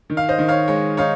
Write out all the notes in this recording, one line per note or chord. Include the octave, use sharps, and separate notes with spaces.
D#3
F5
C5 D#5
D#3
C#5 F5
G#3 C#5
D#4 C#5 F5